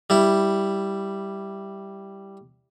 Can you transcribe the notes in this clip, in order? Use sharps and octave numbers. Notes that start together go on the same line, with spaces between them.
G3 E4